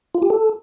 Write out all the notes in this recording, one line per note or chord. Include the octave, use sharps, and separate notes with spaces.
F4
G4
A4